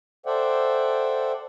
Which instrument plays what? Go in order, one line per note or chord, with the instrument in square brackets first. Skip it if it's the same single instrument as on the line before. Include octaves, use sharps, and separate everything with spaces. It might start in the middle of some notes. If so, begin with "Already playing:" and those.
[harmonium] A4 C5 D5 E5 F#5 G5